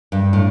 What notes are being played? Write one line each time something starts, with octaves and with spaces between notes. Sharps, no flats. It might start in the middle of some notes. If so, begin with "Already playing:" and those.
G2
A2